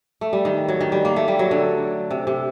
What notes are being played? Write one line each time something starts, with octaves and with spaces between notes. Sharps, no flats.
A3
G3
D#3
F#3
D#3
G3
A#3
A3
G3
F#3
D3
C3
C3